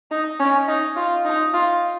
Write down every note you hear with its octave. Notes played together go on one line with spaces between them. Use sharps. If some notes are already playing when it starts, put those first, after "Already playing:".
D#4
C#4
D#4
F4
D#4
F4